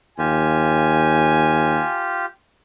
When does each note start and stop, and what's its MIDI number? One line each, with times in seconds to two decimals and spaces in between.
0.18 1.81 39
0.18 2.26 65
0.18 2.26 67
0.18 2.08 80